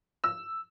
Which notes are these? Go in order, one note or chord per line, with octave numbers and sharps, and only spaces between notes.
E6